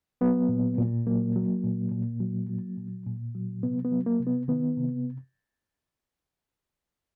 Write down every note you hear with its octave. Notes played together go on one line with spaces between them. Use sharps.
F#3 B3
A#2
A#2
F#3 A#3
F#3
A#2
A#2
F#3
F#3
A#2
A#2
F#3
C3 B3
B3
F#3
A#3
C3
B3
D#3 B3
C3